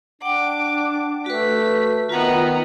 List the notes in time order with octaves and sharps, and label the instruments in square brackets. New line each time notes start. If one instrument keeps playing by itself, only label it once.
[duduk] D4 [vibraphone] F#5 G5 [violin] D6
[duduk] A3 [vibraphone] F#4 B4 [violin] B6
[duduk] D#3 [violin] B3 A#5 [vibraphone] F4 F#5